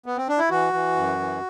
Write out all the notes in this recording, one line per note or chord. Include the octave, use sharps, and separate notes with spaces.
B3
C4
D4
E4
E3 F#4
E3
F#2
E3